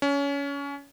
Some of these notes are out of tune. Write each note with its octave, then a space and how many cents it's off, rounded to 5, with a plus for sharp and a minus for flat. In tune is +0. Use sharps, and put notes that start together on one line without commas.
C#4 +25